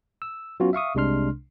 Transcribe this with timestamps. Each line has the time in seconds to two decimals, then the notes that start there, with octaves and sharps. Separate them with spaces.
0.22 E6
0.60 F#3 B3 C#4 F4 F#4
0.73 E5 F5 C#6 D#6
0.95 C2 C3 G#3 D4 C6 F6